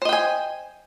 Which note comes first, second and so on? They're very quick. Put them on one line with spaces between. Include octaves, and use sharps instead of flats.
C5 D#5 G5 G#5